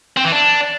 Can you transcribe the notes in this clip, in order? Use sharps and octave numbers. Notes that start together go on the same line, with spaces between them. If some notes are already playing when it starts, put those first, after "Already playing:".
C4
E3
D4